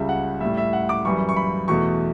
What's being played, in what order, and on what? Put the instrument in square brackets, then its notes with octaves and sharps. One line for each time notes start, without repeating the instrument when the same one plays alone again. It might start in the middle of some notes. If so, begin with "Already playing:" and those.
Already playing: [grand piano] C#2 C#3 G3 E5
F#5
A2 G3 E5
E5
F#5
D6
F#2 E3 G3 C#6
C#6
B5
E2 B2 A3 C#6